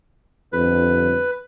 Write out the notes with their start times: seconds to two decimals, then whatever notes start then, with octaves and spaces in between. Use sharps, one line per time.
0.53 G1 F2 B4